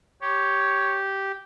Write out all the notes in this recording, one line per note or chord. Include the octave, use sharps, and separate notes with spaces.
G4 C#5